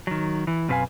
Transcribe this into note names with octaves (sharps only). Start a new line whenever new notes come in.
D#3 F#3
E3
F#2 B2 C4 B4 F5 G#5